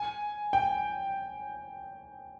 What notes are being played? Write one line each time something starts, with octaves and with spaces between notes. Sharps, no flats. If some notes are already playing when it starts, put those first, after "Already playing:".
Already playing: G#5
G5